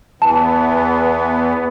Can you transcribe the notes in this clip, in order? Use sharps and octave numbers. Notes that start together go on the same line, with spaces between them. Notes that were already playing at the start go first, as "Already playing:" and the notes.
E2 E3 B3 A5